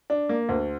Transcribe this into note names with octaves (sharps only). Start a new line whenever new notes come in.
D4
A#3
D2